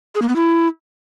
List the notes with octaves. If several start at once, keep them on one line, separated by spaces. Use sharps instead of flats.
G#4
A#3
B3
E4